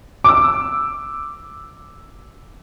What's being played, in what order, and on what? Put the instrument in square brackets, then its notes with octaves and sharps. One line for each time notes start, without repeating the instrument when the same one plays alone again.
[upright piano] D6 E6